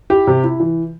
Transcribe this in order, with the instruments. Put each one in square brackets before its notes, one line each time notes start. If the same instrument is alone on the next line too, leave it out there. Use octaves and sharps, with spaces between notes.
[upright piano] E4 [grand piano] G4
[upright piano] C3
E4
E3